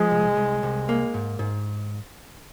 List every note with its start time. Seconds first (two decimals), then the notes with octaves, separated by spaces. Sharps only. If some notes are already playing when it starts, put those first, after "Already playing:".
Already playing: F3 G#3
0.11 C2
0.37 C2
0.63 C2
0.89 A#3
1.14 G#2
1.39 G#2